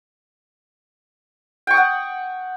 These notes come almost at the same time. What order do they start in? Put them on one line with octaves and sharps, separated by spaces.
G5 C#6 D#6 F#5